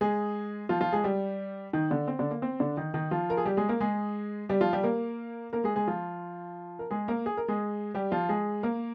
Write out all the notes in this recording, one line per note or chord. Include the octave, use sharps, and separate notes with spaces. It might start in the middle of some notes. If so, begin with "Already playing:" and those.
G#3 G#4
F3 F4
F3 F4
G#3 G#4
G3 G4
D#3 D#4
D3 D4
C4
D3 D4
A#3
C4
D3 D4
D#3 D#4
D#3 D#4
F3 F4
A#4
G#4
G3 G4
G#3 G#4
A#3 A#4
G#3 G#4
G3 G4
F3 F4
G3 G4
A#3 A#4
A#3 A#4
G#3 G#4
G#3 G#4
F3 F4
A#4
G#3 G#4
A#3 A#4
G#4
A#4
G#3 G#4
G3 G4
F3 F4
G#3 G#4
A#3 A#4